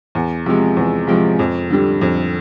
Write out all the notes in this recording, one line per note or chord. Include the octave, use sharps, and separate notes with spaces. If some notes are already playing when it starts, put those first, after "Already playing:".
E2
C3 F3 G#3
E2
C3 F3 G#3
F2
D3 G3
F2